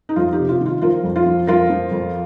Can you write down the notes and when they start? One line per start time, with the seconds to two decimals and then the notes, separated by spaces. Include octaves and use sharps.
0.09 D#4
0.16 F2 F4
0.32 D#4 G4
0.38 C3
0.49 F4
0.61 D#3 F4
0.81 F3 F4 A#4
1.03 F2
1.16 F4
1.26 F3
1.47 F2 F4 A#4
1.70 F3
1.91 F2